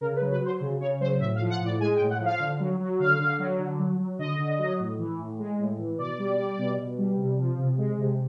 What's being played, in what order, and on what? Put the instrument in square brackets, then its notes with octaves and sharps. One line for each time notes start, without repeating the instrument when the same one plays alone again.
[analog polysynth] C#3 A#4
B4
F#3
B4
F#3 C5
C#3
C#3 C#5
F#3 C5
A2 E5
F5
F3
F#5
A2
D5
G#3 G#5
G5
A2
F#5
F3
F5
D3
F#3
F#3
D3 F5
D3
F#3
D3
F#3
F#3
D3 D#5
D3
F#3
A2
E3
A2
G#3
A2
E3
B2 D5
G3
G3
B2
B2
G3
C3
F3
C3
G#3
C3